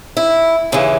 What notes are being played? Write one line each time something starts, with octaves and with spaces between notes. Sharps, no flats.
E4
D#2 C#3 E3